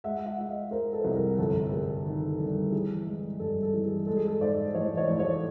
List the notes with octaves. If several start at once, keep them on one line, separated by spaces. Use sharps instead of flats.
G#3 E5 F#5
E5 F#5
G#3
D#5 F5
G#3 A#4 C5
A4 B4
C2
G#4 A#4
G1 A4 B4
G1 G#4 A#4
D#3
G2
E3 G#4
G#3
G2 A4
A4
E3
G#4
G#3 A4
G#4
A4
G#2 C5 D5
A1 C#5 D#5
C#5 D#5
A1
C#5 D#5